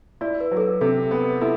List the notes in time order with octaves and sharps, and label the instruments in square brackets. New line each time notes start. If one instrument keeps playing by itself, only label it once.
[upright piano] E4 [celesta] D5
[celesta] B4
[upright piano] F#3
[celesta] A4
B4
[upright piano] C3 [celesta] A4
[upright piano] B3
[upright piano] E4 [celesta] A4